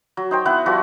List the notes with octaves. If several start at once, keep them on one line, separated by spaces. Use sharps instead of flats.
F#3
D#4 C5 G5
B3 E4 B4 F#5
F3 G3 F#4 B4